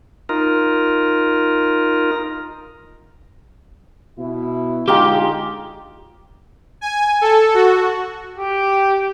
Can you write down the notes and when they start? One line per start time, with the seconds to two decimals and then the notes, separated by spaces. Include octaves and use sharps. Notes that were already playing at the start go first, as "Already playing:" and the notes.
0.29 D#4 F4 A#4
4.19 B2 E4
4.88 D3 G#3 D#4 F4 G4 F5 G5
6.81 G#5
7.21 A4
7.54 F#4
8.38 G4